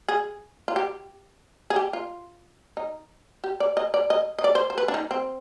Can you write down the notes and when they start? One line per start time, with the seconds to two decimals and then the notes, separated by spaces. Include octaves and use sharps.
0.08 G#4
0.68 F4
0.76 G4
1.70 G#4
1.76 G4
1.93 F4
2.77 D#4
3.44 G4
3.60 D5
3.77 D#5
3.94 D5
4.10 D#5
4.38 D#5
4.44 D5
4.55 C5
4.70 C5
4.78 B4
4.88 D4
4.94 D#4
5.11 C4